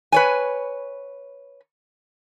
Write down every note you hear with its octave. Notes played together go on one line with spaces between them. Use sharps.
B4 C#5 G#5